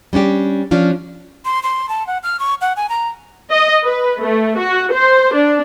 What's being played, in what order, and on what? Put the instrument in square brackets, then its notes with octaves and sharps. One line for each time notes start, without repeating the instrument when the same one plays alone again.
[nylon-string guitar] G3 C#4 D4 G4
F3 C#4 D4 F4
[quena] C6
C6
A5
F#5
F6
C#6
F#5
G#5
A#5
[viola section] D#5
B4
A3
F#4
C5
D4